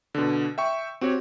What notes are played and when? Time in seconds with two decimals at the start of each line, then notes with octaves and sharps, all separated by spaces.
0.14 B2 D3
0.58 E5 G5 C#6
1.01 C4 F#4 G4 C#5